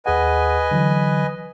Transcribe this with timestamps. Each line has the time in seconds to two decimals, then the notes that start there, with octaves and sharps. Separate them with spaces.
0.06 D#2 G#4 B4 D#5 F#5 G#5
0.71 D3 E3 F#3